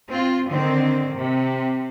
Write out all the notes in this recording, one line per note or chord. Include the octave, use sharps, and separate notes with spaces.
C4 F4
D3 D#3 C4
C3